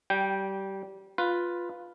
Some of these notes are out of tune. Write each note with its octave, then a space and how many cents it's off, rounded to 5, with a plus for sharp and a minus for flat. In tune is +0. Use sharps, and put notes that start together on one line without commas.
G3 -20 G5 +0
F4 +5 B4 +0